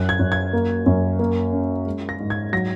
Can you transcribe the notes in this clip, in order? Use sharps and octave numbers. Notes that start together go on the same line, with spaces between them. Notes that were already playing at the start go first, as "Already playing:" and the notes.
Already playing: F#2 F#6
G#6
F#2
G#6
A#3
F#2
A#3
C#4
G#3
A#6
G#2
G#6
F#3 A#6